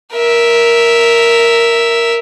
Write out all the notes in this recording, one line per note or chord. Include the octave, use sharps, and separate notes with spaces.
A#4 E5